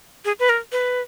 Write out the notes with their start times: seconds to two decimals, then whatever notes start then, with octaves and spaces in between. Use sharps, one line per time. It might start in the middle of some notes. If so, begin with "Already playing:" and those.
0.25 G#4
0.40 B4
0.49 A#4
0.72 B4